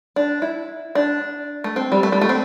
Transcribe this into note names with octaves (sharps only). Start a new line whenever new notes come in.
D4
E4
D4
A3
C4
G3
A3
G3
A3
C4